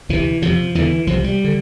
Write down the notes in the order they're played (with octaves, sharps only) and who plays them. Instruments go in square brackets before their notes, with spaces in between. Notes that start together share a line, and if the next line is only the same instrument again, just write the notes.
[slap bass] D2 C3 E3
F2 C3 F3
E2 D3 E3
C2 C3 F3
G3
D3